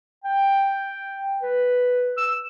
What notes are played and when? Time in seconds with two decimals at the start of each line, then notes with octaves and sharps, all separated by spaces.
0.24 G5
1.42 B4
2.17 E6